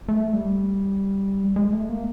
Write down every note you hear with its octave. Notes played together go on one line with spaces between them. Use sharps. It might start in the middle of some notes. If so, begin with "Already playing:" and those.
A3
G3
G#3
A3
A#3